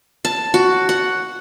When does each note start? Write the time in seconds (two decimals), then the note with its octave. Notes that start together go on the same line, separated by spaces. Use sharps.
0.25 A5
0.54 F#4
0.89 F#5